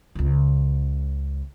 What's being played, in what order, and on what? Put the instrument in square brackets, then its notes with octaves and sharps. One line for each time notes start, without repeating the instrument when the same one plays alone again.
[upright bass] C#2 C#3